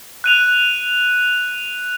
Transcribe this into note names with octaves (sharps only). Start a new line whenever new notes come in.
F#6 D#7 F7